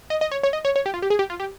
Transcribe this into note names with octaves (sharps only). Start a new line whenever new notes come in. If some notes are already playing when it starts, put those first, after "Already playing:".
D#5
D#5
C#5
C#5
D#5
C#5
C#5
G4
F4
G4
G#4
G4
F4
G4